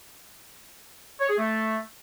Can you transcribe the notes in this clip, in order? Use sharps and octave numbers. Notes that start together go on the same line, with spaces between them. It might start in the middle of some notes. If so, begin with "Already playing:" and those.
C#5
G#4
A3